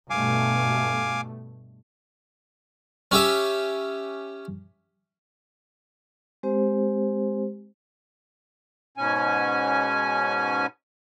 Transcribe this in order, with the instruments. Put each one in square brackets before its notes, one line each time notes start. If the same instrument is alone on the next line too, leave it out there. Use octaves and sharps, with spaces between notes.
[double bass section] G2 B2 A3 [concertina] F5 G#5 D6
[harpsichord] C#4 G4 E5
[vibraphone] G#3 C4 G4 C5
[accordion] G#2 B2 C#4 G#5